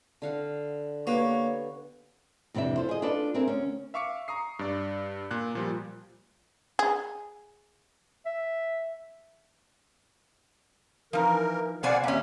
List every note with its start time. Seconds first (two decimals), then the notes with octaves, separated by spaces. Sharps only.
0.22 D3 F5 F#5
1.07 A#3 B3 G4 B4 C#5
2.54 F2 C3 E3 D4 E5
2.78 F4 A4 C5
2.89 G#4 D#5
3.02 D4 F4 A4 B4 D5
3.34 C4 G#4 A#4 E5
3.47 D2 C#4
3.94 E5 F5 C#6 D6 C#7
4.28 A#5 C#6 D#6 C7
4.59 G2 D5
5.31 A#2 F#6
5.55 A#2 F3 G3
6.79 G#4
8.26 E5
11.13 E3 F3 D#4 A#4
11.83 B2 C5 D5 F5 F#5 G#5
12.03 D#2 A#2 C#4 E5